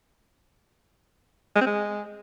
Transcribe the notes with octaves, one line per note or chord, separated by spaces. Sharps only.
G#3
C4
G#3